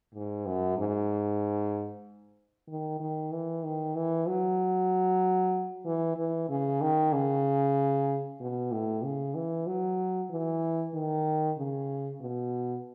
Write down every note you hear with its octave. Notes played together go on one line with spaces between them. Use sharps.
G#2
F#2
G#2
D#3
D#3
E3
D#3
E3
F#3
E3
E3
C#3
D#3
C#3
B2
A2
C#3
E3
F#3
E3
D#3
C#3
B2